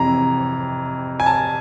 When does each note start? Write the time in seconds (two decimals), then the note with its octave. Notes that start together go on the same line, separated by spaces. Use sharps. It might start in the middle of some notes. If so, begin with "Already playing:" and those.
Already playing: F2 C3 E3 A#5
1.20 G#5
1.26 A5